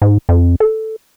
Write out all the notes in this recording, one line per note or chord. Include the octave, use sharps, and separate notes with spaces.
G#2
F2
A4